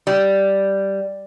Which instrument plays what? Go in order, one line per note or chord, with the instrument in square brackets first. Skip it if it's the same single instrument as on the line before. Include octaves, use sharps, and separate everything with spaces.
[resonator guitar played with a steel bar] G3